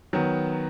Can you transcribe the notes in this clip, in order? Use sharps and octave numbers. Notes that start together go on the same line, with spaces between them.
D#3 F#3 B3